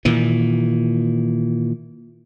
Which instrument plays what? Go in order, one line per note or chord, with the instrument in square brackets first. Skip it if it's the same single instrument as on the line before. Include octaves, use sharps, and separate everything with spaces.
[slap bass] A#2 D#3 E3